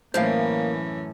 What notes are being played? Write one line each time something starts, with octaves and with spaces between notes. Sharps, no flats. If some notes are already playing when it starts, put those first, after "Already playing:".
F#2 A2 E3 A#3 C#4 C5 F5